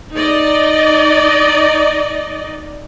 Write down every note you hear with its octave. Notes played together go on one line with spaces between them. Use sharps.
D#4 D5 D#5